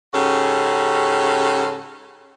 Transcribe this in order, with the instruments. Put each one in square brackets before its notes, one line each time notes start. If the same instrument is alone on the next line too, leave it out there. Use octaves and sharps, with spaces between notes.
[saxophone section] G#2 C#3 C#4 F#4 G4 A4